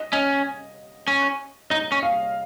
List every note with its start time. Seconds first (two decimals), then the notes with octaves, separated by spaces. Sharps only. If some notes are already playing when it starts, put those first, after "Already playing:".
Already playing: D#5
0.13 C#4 D#5
1.08 C#4
1.70 D#4 D#5
1.92 C#4
2.03 F5